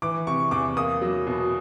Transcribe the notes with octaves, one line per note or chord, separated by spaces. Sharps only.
E3 D6
C3 C#6
E2 D6
A#3 D#6
F#3
B2